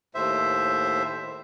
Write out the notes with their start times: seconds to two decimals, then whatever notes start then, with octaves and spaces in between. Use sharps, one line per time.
0.15 D#2 A2 C5 E5